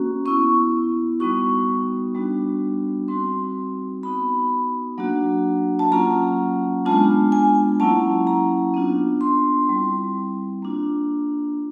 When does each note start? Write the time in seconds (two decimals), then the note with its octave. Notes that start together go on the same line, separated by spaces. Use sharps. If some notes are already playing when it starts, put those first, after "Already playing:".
Already playing: A#3 C#4 F#4
0.25 B3 E4 C#6
1.20 G3 B3 D#4 F#4 C#6
2.15 G3 B3 D4 F#4
3.08 G3 C4 D#4 F#4 C6
4.03 B3 D#4 F#4 B5
4.98 F#3 A#3 D4 F#4
5.79 A5
5.92 F#3 A#3 C#4 F4 A#5
6.86 G#3 B3 D4 F4 A5
7.32 G#5
7.80 F#3 A#3 C#4 E4 A5
8.27 A#5
8.74 B3 D4 F4
9.21 C6
9.69 G3 C4 E4
10.62 A#3 D4 F4